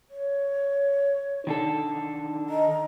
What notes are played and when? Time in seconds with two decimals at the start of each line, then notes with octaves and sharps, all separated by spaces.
0.10 C#5
1.47 D#3 D4 D#4 A4
2.49 D#5 A#5